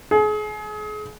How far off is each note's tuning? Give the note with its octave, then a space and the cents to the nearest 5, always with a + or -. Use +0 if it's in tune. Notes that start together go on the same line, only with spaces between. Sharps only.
G#4 +35